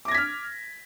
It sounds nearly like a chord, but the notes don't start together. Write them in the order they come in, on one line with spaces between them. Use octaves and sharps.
D6 A#6 G#6 B6 F6